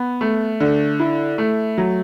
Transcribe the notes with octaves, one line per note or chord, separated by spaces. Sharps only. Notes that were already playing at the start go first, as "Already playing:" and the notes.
Already playing: B3
A3
D3
E4
A3
F#3